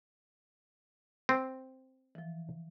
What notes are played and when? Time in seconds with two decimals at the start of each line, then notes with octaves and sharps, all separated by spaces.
1.29 C4
2.15 E3 F3